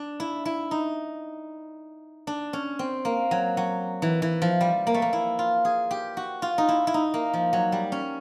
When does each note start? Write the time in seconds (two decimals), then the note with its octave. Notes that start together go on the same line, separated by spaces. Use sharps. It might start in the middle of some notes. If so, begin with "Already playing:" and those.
Already playing: D4
0.20 E4
0.45 E4
0.71 D#4
2.27 D4
2.53 C#4
2.79 C4
3.05 A#3
3.31 F#3
3.57 F#3
4.02 E3
4.22 E3
4.42 F3
4.61 G3
4.87 A#3
4.94 A3
5.02 A#3
5.13 E4
5.39 F4
5.65 G#4
5.91 G4
6.17 F#4
6.42 F4
6.58 D#4
6.68 E4
6.87 E4
6.94 D#4
7.14 A#3
7.33 F3
7.53 F#3
7.72 G3
7.92 C#4